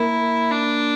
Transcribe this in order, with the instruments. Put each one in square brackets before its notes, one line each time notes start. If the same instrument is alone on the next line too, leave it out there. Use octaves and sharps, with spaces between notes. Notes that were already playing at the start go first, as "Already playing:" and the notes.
Already playing: [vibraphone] A#3 A#4 [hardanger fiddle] E4
[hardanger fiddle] D4